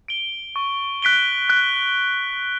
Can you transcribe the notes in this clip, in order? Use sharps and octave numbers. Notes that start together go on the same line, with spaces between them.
D7 G7
C#6
F#6 B6 D7 G7
F#6